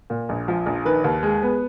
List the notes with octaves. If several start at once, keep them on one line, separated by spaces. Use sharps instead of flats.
A#2
A#1
F3
A#1
D#3 B4
D#2
G#3
B3